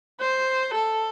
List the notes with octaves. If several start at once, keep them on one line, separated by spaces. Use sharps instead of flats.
C5
A4